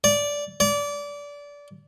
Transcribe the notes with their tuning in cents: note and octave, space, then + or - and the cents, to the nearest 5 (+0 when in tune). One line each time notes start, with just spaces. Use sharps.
D5 -15
D5 -25